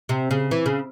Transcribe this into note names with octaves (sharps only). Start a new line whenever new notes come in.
C3
C#3
E3
C#3